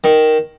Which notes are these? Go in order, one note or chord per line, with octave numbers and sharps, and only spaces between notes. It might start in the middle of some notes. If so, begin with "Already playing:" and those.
D#3